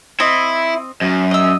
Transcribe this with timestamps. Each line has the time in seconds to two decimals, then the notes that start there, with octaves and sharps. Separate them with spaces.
0.20 C4 E4 D#5
1.01 F#2
1.31 D#5 E6